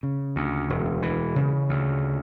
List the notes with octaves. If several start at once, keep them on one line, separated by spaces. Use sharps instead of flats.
C#3
D2
E1
E3
C#3
D2